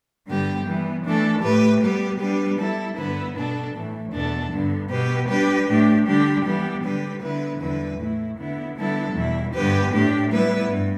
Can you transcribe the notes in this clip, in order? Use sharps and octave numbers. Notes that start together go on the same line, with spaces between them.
G2 D3 G3 B3 G4
E3 G3 B3
E3 A3 D4 A4
A2 A3 G4 B4
G3 B3 G4 B4
G3 B3 D4 G4 B4
G3 E4 A4
G2 D3 B3 E4 B4
B2 B3 D4 A4
A2 E3 A3
E2 B2 B3 D4 A4
G2 D3 B3
B2 B3 G4 B4
G3 D4 G4 B4
A2 A3 D4 G4
D3 G3 D4 G4
E3 G3 B3 G4
D3 G3 D4 G4 B4
D3 B3 E4 B4
E2 D3 G3 E4 B4
A2 A3 E4
D3 B3 E4
D3 G3 B3 E4 A4
E2 B2 G3 E4
G2 D3 B3 G4 B4
A2 A3 D4 G4
G3 B3 E4 B4
G2